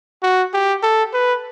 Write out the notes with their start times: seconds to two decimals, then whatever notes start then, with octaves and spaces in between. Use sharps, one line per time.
0.22 F#4
0.54 G4
0.83 A4
1.13 B4